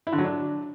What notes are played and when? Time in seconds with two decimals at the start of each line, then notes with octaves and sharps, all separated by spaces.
0.07 E4
0.13 D3
0.18 F#3
0.24 D4